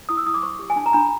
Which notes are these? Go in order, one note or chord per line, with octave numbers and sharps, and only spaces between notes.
E4 D#6
E6
E4 D#6
D6
C5 C#6
G4
G#5
D4 A5
A#5
D4 B5